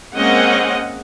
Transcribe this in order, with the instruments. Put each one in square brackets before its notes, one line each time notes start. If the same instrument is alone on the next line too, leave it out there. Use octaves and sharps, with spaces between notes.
[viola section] G#3 A#3 C4 C#4 D#5 F#5